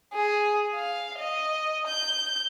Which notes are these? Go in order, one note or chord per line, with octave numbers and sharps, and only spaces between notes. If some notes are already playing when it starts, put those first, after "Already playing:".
G#4
F5
D#5
G6